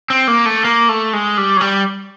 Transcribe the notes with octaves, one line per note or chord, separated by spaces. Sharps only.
C4
A#3
A3
A#3
A3
G#3
G3
F#3
G3